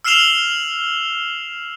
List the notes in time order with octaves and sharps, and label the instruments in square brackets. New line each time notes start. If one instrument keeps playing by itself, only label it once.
[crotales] E6 F6 C7 E7 F7 G7